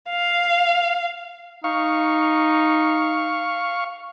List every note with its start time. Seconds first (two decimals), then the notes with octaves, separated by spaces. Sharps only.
0.10 F5
1.64 D#4 F5 C#6